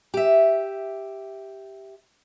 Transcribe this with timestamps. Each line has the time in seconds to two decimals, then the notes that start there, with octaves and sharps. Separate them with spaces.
0.14 G4 E5